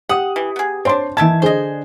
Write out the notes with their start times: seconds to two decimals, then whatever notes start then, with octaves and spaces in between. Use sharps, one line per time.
0.09 G4 F#5 D#6
0.36 E3
0.56 B3 G#4
0.85 C4 D4 C5 C#5 C6
1.17 D#3 E3 E5 A5 G#6
1.42 D3 D4 G#4 C5 D#5